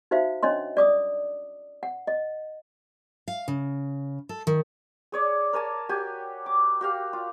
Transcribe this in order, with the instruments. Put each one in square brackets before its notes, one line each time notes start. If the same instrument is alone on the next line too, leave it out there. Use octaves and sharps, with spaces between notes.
[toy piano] D#4 F#4 C5 E5 F5
C#4 D4 C#5 D#5 C6
D5 D6 D#6
F#5
D#5
[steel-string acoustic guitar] F5
C#3
A4
D#3
[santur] G#4 C#5 D5
A#4 C#5 G#5 A5
F#4 G4 G#5
D6
F#4 G4 F5
F4